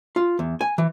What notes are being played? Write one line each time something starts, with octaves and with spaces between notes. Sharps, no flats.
F4
E2
G#5
E3